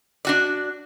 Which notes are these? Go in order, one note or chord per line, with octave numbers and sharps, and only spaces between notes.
D4 F#4 D5